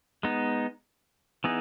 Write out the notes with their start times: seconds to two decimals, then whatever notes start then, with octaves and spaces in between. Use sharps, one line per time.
0.23 G#3 B3 D#4
1.44 E3 B3 D#4 G#4